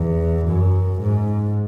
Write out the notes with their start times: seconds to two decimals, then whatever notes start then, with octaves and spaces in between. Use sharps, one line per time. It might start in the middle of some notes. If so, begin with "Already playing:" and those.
Already playing: E2
0.46 F#2
1.02 G#2